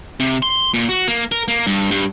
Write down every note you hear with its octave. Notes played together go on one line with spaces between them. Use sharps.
C3
C6
A#2
F#4
A#3
A#4
A#3
G2
G2